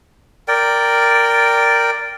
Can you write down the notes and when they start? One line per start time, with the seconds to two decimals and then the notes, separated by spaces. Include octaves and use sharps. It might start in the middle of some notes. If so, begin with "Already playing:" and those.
0.48 A#4 D5 G5